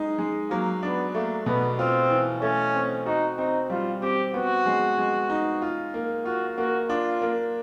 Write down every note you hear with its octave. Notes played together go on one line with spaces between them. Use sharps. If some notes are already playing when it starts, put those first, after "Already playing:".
Already playing: G#3 D#4
G#3
F#3 A#3
B3 D4
A3 A#3
B2 B3
C4 F4
E3
A3 C#4
C4
D#4 F#4
C4 D#4
G3 F4
C4 G4
B3 F#4
G#3
G#3
D#4
F4
A#3
F4 F#4
A#3 F#4
D4 F4
A#3